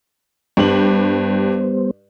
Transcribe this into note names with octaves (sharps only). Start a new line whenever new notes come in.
G2 G3 B3 G4 C5 F#7